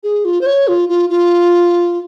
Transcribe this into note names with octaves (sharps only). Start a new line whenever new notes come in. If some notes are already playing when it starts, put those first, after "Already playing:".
G#4
F4
C5
C#5
F4
F4
F4